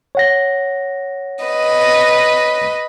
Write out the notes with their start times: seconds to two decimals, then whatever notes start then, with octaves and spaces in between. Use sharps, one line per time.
0.15 C#5 F#5 A#6
1.45 B4 D#5